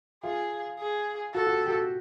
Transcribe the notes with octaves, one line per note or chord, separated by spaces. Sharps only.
F4 G#4
G#4
F#4 A4
F#4
G4
G4
F#4